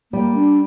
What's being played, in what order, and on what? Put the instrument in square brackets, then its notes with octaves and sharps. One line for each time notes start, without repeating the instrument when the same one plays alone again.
[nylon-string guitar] G3 [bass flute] A#3
[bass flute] D4